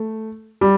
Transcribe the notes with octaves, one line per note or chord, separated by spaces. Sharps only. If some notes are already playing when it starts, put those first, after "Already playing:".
Already playing: A3
G3